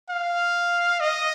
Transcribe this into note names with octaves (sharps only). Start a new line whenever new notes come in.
F5
D#5